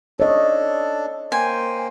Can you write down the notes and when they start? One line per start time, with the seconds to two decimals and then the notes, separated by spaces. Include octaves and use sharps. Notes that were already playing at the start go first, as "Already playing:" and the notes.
0.20 D4 A4 C#5 D#5
1.32 A#3 C5 G5 G#5